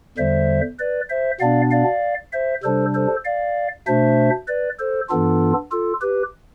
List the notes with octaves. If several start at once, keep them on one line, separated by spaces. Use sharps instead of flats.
E2 D3 G3 C5 E5
B4 D5
C5 E5
B2 B3 D4 D5 F5
D5 F5
C5 E5
C3 G3 D4 A4 C5
A4 C5
D5 F5
B2 A3 D4 C5 E5
B4 D5
A4 C5
G2 E3 B3 D4 F4 A4
F4 A4
G4 B4